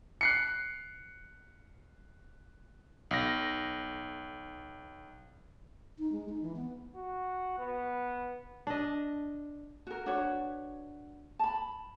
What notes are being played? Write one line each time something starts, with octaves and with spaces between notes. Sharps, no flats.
F#6 C7 C#7
B1 A#6
D#4
G#3
D#4
E3
B3
F#4
B3
D4 D#5
F#4 A#4
D4 F#4 B4 C#5
A5 B5